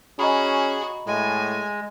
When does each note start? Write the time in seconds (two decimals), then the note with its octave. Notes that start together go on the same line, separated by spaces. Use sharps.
0.19 C#4 F#4 G#4 D#5 A#5 B5
1.07 A2 G#3 G#5